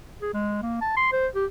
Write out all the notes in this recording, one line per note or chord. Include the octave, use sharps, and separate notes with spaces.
G#4
G#3
A#3
A5
C6
C5
G4